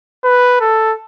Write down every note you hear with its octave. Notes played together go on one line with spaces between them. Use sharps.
B4
A4